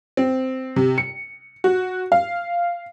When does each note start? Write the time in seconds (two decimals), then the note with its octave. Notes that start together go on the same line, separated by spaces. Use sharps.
0.17 C4
0.76 C3
0.98 C#7
1.64 F#4
2.12 F5